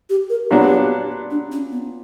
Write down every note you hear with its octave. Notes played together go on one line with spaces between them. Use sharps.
G4
A#4
A#2 F#3 B3 D4 G4
D4
C#4
B3